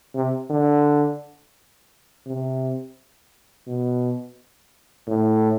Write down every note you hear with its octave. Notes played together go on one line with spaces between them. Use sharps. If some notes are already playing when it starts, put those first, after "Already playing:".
C3
D3
C3
B2
A2